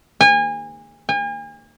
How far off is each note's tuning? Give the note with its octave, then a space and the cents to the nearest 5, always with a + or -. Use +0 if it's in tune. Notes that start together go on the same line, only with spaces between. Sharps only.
G#5 -30
G#5 -40